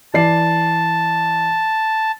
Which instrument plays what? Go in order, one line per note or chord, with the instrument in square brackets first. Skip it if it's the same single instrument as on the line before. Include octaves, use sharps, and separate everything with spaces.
[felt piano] E3 D5 C7 [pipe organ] A5